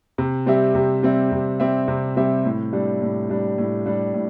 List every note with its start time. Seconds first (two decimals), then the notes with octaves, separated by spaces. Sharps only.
0.18 C3
0.46 G3 C4 G4 E5
0.75 C3
1.03 G3 C4 G4 E5
1.32 C3
1.60 G3 C4 G4 E5
1.88 C3
2.16 G3 C4 G4 E5
2.45 A2
2.73 G3 D4
3.02 A2
3.29 G3 D4
3.58 A2
3.86 G3 D4
4.14 A2